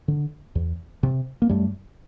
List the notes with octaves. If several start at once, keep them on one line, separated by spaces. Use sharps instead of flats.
D3
E2
C3
A#3
F#2 G3 A3